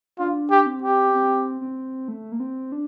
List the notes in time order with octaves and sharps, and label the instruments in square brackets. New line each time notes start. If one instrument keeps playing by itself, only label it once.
[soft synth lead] D4 [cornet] F4
[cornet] G4
[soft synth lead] C4
[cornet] G4
[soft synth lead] C4
C4
A3
A#3
C4
D4